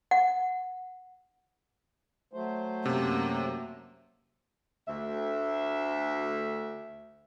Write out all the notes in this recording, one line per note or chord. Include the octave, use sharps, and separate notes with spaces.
F#5
F#3 A3 C5
F#2 C3 A#3
D2 E5